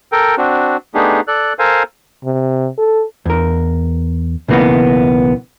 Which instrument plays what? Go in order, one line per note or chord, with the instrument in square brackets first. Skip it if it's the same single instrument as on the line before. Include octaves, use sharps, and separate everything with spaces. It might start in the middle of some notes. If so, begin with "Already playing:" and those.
[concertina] A4 A#4 G5
C4 D4 F#4
A3 B3 D4 D#4 G4 G#4
A4 D5 F#6
A4 A#4 C5 F5 G#5
[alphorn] C3
A4
[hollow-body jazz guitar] E2 A#4
B1 C#3 E3 A#3 B3